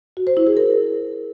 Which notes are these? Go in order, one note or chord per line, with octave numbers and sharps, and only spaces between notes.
F#4
C5
E4
G#4
A#4